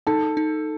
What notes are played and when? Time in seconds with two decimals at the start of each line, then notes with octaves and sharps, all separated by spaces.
0.07 D#4 A4 A5
0.37 D#4